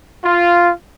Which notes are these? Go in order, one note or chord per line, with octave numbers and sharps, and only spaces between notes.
F4